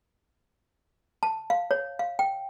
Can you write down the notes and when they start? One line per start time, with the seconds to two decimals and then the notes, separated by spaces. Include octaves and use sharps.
1.23 A5
1.50 F5
1.71 C#5
1.99 F5
2.19 G5